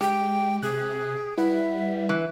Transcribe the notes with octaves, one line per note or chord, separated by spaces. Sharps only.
G#3 G4 G5
C3 G#4 F#6
G3 E4 B4 E5 F#5
E3